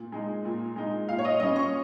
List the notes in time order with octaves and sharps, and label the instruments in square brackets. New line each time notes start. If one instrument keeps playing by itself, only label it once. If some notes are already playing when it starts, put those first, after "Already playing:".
Already playing: [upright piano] A#2
G#3 D#4
A#2
G#3 D#4
A#2 F5
C#5
D#5
G3 C#4 D#5
C#6